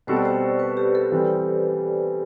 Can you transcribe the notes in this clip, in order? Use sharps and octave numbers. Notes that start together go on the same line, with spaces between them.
B2 G3 C4 F#4 A4 C5
D5
C5
B4
G4
A4
E3 G3 C4